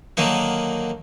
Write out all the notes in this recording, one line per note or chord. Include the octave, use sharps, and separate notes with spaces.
D3 D#3 F#3 A#3 D#4